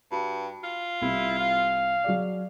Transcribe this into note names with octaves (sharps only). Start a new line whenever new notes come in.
G2 F#4
F4
C2 E4
F5
F#3 G#4 D5